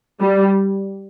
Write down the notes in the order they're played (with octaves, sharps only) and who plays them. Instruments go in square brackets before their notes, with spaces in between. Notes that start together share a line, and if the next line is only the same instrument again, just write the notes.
[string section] G3